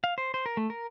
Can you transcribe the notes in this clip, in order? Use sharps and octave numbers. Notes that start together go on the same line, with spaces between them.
F5
C5
C5
A#4
A3
A#4